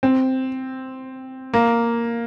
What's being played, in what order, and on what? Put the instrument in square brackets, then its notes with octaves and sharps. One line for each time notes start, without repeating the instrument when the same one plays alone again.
[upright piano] C4
A#3